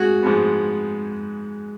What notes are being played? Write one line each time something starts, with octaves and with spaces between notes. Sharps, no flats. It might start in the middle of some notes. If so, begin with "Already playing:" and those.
Already playing: G#2 F#4 G#4
G#2 F3 G#3 B3